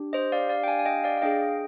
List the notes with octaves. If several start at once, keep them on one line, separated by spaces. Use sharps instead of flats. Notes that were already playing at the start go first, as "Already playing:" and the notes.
Already playing: D4 G4
C5 D#5
D5 F5
D5 F5
G5
F5 G#5
G#5
D#5 G5
D5 F5
F5
D4 G#4 D#5 G5